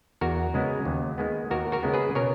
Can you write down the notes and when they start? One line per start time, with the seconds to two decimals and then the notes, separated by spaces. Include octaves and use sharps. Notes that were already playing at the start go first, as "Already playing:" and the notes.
0.21 E2 F#4 A#4
0.54 C#3 G#3 B3
0.85 D#2
1.18 D#3 G#3 B3
1.50 D#2 F#4 A#4
1.72 F#4 A#4
1.83 C#3 G#3 B3
1.94 G#4 B4
2.15 B2 A#4 C#5